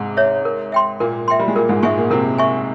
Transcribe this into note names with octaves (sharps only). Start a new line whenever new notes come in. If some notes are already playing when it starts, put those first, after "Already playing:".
Already playing: G#2 C3 G#3
C#5 E5
A#4
E5 G5 C6
A#2 A#3 A#4
E5 G5 C6
G3
G#3
A#2 A#3 A#4
G#2 G#3
G#2 G#3 E5 G#5 C#6
A#2 A#3
C3 C4 A#4
E5 G#5 C#6